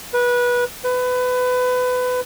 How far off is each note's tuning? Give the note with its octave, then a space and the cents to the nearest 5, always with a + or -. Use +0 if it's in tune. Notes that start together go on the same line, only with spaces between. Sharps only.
B4 -20
B4 +25